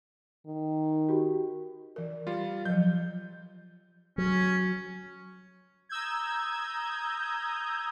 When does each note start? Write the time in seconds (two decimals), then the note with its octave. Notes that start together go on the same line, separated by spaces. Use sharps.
0.46 D#3
1.09 F#4 G4
1.96 E3 A#4
2.27 G3 F4
2.65 F3 F#3 G6
4.18 F#3 C#4
5.89 A#5 D#6 E6 G6 G#6